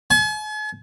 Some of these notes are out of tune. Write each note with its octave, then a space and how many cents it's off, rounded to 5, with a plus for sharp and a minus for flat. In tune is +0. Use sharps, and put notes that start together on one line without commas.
G#5 +45